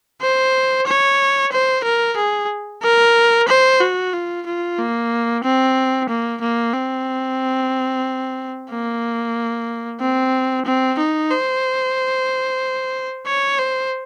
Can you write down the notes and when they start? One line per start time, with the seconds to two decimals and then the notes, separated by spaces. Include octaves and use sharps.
0.22 C5
0.87 C#5
1.52 C5
1.85 A#4
2.17 G#4
2.83 A#4
3.48 C5
3.81 F#4
4.13 F4
4.46 F4
4.79 A#3
5.44 C4
6.09 A#3
6.41 A#3
6.74 C4
8.70 A#3
10.01 C4
10.65 C4
10.98 D#4
11.31 C5
13.27 C#5
13.59 C5